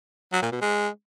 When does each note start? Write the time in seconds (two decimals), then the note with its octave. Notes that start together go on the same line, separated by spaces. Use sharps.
0.33 F#3
0.42 A#2
0.52 B2
0.61 G#3